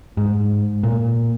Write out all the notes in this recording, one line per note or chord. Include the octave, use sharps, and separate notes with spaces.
G#2
A#2